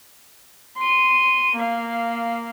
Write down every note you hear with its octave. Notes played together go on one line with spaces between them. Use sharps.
C6 D#7
A#3 F5